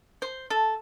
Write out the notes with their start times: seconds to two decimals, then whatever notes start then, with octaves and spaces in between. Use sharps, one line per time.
0.22 C5
0.50 A4